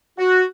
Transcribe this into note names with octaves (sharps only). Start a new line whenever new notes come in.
F#4